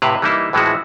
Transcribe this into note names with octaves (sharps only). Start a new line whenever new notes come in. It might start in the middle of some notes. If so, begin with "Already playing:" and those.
A2 C3 E4 B4 F5
E3 G3 A#3 D#4 E4
A2 E3 F3 G#3 E4 F#4